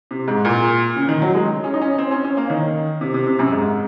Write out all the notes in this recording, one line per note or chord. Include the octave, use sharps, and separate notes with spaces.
C3
G#2
A#2
C#3
D#3
F#3
G#3
C#4
D#4
C#4
C4
C#4
C#4
A#3
D#3
C3
C3
C3
F#2
G#2